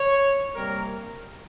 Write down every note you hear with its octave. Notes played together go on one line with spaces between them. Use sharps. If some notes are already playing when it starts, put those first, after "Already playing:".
Already playing: C#5
C3 G3 A#3 A#4